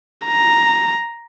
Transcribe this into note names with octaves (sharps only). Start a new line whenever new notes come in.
A#5